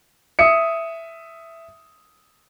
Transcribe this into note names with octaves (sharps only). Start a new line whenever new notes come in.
E5 D#6 C#7